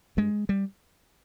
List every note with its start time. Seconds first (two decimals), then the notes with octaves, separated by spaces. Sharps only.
0.17 G2 G#3
0.49 G3